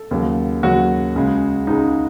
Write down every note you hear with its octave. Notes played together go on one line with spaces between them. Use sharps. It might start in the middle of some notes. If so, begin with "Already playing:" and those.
Already playing: A4
D#2 C#3 F#3
D#2 C#3 F#3 F#4
C#2 C#3 G#3
C#2 C#3 G#3 D#4